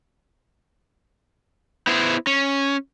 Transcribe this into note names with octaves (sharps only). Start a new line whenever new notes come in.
B3 E4 C5
C#4